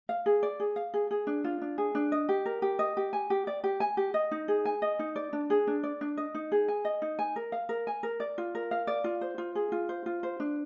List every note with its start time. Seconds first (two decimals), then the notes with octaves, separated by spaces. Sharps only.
0.09 F5
0.26 G#4
0.43 D5
0.60 G#4
0.76 F5
0.94 G#4
1.11 G#4
1.27 D4
1.44 F4
1.62 D4
1.78 G#4
1.95 D4
2.12 D#5
2.29 G4
2.46 A#4
2.62 G4
2.79 D#5
2.97 G4
3.13 G#5
3.30 G4
3.47 D5
3.64 G4
3.80 G#5
3.97 G4
4.14 D#5
4.31 D#4
4.48 G#4
4.65 G#5
4.82 D#5
4.99 D#4
5.16 D5
5.33 D4
5.50 G#4
5.67 D4
5.83 D5
6.01 D4
6.17 D#5
6.35 D#4
6.52 G#4
6.68 G#5
6.85 D#5
7.02 D#4
7.19 G#5
7.36 A#4
7.52 F5
7.69 A#4
7.87 G#5
8.03 A#4
8.20 D5
8.38 F4
8.55 A#4
8.71 F5
8.87 D5
9.04 F4
9.21 C5
9.38 F4
9.55 G#4
9.72 F4
9.89 C5
10.06 F4
10.23 C5
10.40 D4